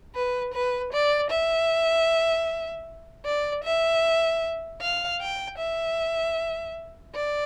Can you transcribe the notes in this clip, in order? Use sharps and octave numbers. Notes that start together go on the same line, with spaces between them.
B4
B4
D5
E5
D5
E5
F5
G5
E5
D5